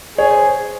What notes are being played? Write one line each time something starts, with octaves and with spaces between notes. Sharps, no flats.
G#4 C#5
C5